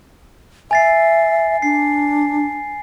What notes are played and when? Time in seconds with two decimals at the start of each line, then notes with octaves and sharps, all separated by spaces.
0.71 E5 G#5 A6 C7
1.62 D4 C7